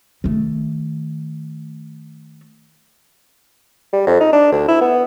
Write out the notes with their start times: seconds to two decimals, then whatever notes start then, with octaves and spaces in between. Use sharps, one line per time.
0.24 D#3 A3
3.93 G3
4.07 F2
4.20 D#4
4.32 D4
4.52 D2
4.68 E4
4.81 B3